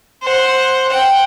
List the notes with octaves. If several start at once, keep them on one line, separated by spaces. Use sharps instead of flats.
C5 F#5
F#5 G5